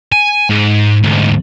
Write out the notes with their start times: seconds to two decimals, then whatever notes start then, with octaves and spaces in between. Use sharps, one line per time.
0.12 G#5
0.50 G#2
1.03 D2 G#2